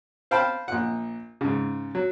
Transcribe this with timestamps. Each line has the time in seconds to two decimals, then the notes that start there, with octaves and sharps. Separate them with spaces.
0.31 C5 F5 G5 A5 B5
0.68 A#1 F#5
1.41 G#2 C#3
1.95 F#3